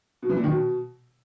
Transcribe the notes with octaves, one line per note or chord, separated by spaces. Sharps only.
B2
E3
A#2
D#3
B2